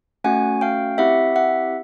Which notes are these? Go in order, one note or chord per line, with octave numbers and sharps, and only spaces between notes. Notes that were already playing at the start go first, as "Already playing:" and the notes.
A3 C#4 F#4 F#5 G#5
F5 G5
C4 E4 G4 E5 F#5
E5 F#5